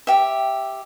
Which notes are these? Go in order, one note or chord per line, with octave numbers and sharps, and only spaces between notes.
G4 E5